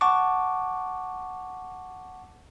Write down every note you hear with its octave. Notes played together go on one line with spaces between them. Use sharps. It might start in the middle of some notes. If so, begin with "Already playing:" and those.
F#5 A5 C#6 D6